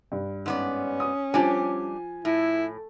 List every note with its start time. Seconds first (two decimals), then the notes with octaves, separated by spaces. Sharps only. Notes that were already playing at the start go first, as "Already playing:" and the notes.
0.12 G2
0.46 G#2 B3 C#4 D5
1.00 D#6
1.34 F3 G3 D4 G4 G#5
2.25 A2 E4